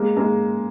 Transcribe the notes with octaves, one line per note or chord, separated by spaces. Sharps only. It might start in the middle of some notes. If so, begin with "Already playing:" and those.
Already playing: G#3 A#3
G#3 A#3